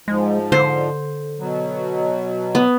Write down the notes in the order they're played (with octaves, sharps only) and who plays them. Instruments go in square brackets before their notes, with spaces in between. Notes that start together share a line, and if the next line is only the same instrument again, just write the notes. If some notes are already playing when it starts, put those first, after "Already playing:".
[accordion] G#2 F3 [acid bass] G#3
[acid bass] D3 [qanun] C5
[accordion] B2 F#3
[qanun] B3